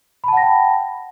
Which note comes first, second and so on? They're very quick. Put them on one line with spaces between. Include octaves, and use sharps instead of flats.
B5 A5 F#5 A#6 G5